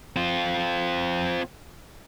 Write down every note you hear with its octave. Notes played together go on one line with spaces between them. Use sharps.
C4 F4